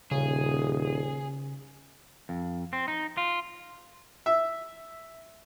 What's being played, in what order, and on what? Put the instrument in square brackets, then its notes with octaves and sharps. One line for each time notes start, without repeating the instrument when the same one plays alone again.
[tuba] D#1 [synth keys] C#3 [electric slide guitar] G#4
[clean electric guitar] F2
C4
D#4
F4
[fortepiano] E5